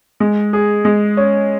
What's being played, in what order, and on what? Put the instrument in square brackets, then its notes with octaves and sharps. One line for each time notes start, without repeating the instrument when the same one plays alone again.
[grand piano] G#3
G#4
G#3
C#4